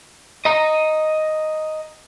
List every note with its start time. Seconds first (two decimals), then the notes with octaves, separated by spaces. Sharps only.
0.45 D#5 A#5